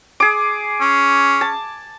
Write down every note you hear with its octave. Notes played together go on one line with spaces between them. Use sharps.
G#4 D6
C#4
A5